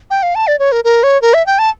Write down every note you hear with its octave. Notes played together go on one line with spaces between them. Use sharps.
G5
F5
A5
D5
C#5
A#4
A#4
C#5
A#4
E5
G5
A5